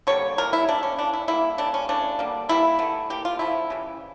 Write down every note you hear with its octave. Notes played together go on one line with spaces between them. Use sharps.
D3 G3 A#3 C#5
E3 G3 A#3 A#4
E4
C#3 G3 A#3 D4
C#4
E3 A#3 D4
E4
D3 G3 A#3 E4
C#3 G3 A#3 D4
C#4
C#3 E3 A3 D4
D3 G3 A#3
E3 G3 A#3 E4
D3 A3
E3 A#3 G4
F4
D3 F3 A3 E4
C#3 E3 G3